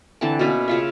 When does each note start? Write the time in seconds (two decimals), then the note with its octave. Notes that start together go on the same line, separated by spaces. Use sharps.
0.21 D3 E3 C4 A5
0.39 B2 A#3 C#4 B4
0.68 C#3 F4 E5